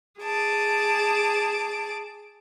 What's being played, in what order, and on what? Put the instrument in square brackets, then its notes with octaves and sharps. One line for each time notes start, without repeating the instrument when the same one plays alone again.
[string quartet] G#4 A5 D6